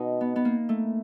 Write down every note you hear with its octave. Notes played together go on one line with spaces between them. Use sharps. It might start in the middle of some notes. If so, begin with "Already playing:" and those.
Already playing: B2 D#4
B3
B3
A#3
A3